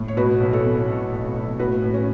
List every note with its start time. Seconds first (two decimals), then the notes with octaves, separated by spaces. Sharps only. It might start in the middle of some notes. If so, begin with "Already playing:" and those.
Already playing: A2
0.08 C#5
0.17 B2 F#4 B4
0.40 B1
0.53 A4 C#5
0.65 B2
0.88 B2
1.12 B1
1.36 B1
1.59 A2 F#4 B4
1.82 A2
1.94 C#4